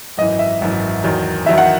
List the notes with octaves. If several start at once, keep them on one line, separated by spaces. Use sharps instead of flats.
G#1 F#2 E3 D#5
E5
G#1 F#2 E3
E2 D#3 F#3
E2 D#3 F#3 E5
F#5